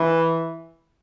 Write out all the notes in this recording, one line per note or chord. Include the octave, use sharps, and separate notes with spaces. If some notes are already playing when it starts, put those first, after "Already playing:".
Already playing: E3